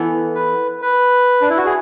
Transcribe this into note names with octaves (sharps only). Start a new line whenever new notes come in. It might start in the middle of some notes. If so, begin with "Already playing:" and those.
Already playing: E3 B3 E4 A4
B4
B4
D4
E4
F#4
G#4